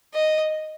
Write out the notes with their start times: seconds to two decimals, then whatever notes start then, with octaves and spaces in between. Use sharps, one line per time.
0.14 D#5